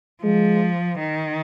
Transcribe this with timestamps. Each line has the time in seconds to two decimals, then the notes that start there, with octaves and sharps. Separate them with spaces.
0.23 F3 G#3
1.00 D#3